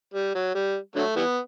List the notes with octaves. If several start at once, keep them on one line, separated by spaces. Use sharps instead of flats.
G3
F#3
G3
D3 F#3 A3
E3 G3 B3